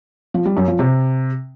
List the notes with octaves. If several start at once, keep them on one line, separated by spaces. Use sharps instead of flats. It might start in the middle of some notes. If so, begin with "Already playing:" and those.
F3
G3
F#2
F3
C3